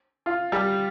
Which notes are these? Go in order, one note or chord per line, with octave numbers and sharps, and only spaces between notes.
F4
G3